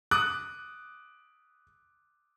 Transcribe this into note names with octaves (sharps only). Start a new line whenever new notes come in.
D6 D#6 F#6